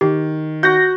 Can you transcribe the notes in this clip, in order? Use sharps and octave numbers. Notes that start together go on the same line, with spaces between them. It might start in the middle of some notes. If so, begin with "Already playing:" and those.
D#3 G4
F#4 G6 A#6